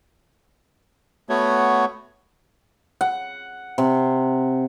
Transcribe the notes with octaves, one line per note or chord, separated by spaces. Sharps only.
A3 B3 F#4 C#5
F#5
C3